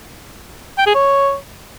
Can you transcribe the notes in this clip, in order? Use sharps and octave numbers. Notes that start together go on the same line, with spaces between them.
G5
G#4
C#5